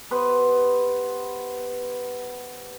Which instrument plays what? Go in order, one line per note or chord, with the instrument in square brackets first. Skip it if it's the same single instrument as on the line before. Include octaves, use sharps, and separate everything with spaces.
[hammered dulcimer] B3 G4 B4 C5